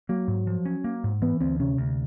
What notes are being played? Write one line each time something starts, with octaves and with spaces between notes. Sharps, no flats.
F#3 A#3
G#2
F3
C#4
A#3
G#2
E3 B3
D2 C4
C3 C#4
D2